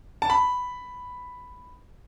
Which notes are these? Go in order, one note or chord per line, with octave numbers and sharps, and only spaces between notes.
A5
B5